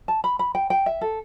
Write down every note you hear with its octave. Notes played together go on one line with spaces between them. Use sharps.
A5
B5
B5
G5
G5
E5
A4